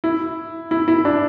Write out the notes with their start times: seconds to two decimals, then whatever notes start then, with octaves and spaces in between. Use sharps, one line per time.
0.04 E4
0.71 E4
0.88 E4
1.05 D4